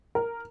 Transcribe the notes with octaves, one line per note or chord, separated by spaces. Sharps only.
A#4